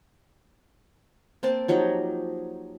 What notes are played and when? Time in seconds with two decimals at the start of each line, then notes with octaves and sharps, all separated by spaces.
1.43 A#3 C4 C5 A5
1.68 F3 F#3 D#4 G4